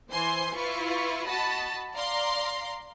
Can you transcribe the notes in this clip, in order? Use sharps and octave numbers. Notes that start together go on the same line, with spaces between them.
E3 C5 G#5 C6
E4 F4 B4 C#6
F#4 D#5 A5 B5
D5 F5 A#5 C6